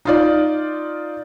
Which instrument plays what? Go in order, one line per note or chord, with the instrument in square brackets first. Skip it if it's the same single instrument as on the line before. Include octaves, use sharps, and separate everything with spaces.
[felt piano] D#4 F4 D5